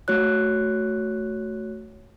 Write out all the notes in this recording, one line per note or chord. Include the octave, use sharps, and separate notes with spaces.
A3 F#4 C#5 F#6